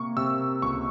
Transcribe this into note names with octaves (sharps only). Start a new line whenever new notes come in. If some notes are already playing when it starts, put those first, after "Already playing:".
Already playing: C3 A#3 C#6
C3 E6
C#2 C#6